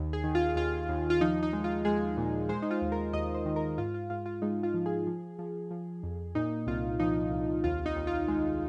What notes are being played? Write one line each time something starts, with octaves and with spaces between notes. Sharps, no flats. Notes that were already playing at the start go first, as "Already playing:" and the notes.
Already playing: D#2
G#4
D#3
F4
D#2 F4
D#2
F4
F3 D#4
D#4
G#3
F4
G#3 G#4
A#2
G#3 C5
D#4
F4
D#2
A#4
D#2 D#5
C5
D#3
A#4
G#2 F4
F4
G#2 F4
F4
G#3 D#4
F4
F3
G#4
F3
F3
F3
F2
A#2 D#4
C2 F4
F3 D#4
C2
D#2 F4
D#4
D#2
F4
G#3